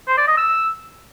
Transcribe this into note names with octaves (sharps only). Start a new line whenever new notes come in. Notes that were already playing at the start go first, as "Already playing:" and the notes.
C5
D5
D#5
E6